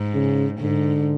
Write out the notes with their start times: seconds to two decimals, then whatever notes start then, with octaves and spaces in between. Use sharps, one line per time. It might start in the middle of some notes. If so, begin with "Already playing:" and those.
Already playing: G#2
0.14 C#3
0.60 G#2 D3